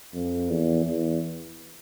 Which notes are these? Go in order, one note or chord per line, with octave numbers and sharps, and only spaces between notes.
F2
E2
E2